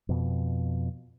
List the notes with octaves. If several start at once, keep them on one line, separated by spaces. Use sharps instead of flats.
F2 B2